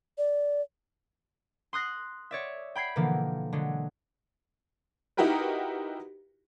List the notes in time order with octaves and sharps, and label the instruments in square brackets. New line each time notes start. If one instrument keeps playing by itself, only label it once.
[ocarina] D5
[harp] C6 D#6 F#6 A#6 C7
C#5 D5 E5
G5 B5 G#6 C7
B2 D3 E3 F3 A#3
D3 F#3 G#3
[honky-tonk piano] D#4 E4 F#4 G4 A#4 B4